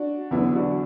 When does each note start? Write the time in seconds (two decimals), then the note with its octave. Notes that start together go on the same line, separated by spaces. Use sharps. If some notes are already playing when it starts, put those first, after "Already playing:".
Already playing: D4 F#4
0.31 E2 D3 F#3 B3 E4
0.55 D4 F#4